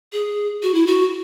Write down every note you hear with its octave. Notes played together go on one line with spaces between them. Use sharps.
G#4
F#4
E4
F#4